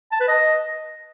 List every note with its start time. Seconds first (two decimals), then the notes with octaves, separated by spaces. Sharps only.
0.12 A5
0.20 B4
0.28 D#5